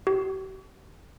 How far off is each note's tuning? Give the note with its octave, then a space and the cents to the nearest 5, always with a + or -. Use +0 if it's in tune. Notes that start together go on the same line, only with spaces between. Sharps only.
G4 -40